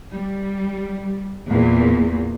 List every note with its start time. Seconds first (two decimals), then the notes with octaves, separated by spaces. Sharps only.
0.12 G3
1.47 E2 A#2